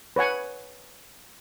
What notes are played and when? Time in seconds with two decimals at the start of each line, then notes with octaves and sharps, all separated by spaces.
0.16 B4 C#5 F#5 G#5